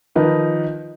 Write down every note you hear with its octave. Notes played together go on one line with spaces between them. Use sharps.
D#3 F3 D#4 A#4 B4